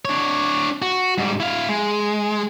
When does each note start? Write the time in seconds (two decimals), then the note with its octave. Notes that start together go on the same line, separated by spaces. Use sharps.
0.05 D4 C#5
0.82 F#4
1.18 G#2 G3
1.40 E4 F5
1.69 G#3